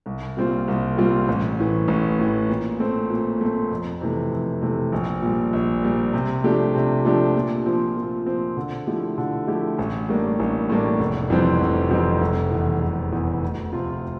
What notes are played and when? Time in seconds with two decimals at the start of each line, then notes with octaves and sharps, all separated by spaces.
0.06 C2
0.37 A#2 G3 C4 F4
0.68 C2
0.97 A#2 G3 C4 F4
1.28 A1
1.59 A2 E3
1.88 A1
2.19 A2 E3
2.49 A#2
2.79 A3 C4
3.10 A#2
3.41 A3 C4
3.71 F2
4.01 C3 E3 A3
4.31 F2
4.62 C3 E3 A3
4.92 A#1
5.22 A#2 G3
5.53 A#1
5.83 A#2 G3
6.13 C3
6.44 F3 A3 D4 G4
6.75 C3
7.05 F3 A3 D4 G4
7.35 A#2
7.66 F3 C4
7.96 A#2
8.26 F3 C4
8.57 D3
8.87 F3 A3 E4 G4
9.18 D3
9.48 F3 A3 E4 G4
9.79 A1
10.09 A2 G3 A#3 D4
10.39 A1
10.69 A2 G3 A#3 D4
10.99 F1
11.30 F2 E3 G3 C4
11.60 F1
11.91 F2 E3 G3 C4
12.21 F1
12.52 E2 E3
12.81 F1
13.12 E2 E3
13.43 D2
13.73 C3 F3 C4 F4